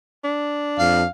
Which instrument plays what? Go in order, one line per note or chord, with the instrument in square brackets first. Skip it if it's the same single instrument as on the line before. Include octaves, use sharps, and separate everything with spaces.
[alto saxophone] D4
[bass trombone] F2 [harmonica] F5